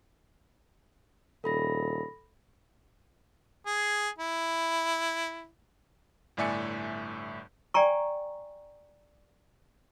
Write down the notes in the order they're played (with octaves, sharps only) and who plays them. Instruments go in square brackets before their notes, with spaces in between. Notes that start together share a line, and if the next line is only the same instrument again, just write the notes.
[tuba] D#1 [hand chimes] A4 B5 A#6
[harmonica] G#4
E4
[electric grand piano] G1 A2 D5 E5 G#5 C#7
[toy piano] D5 G5 G#5 A#5 C#6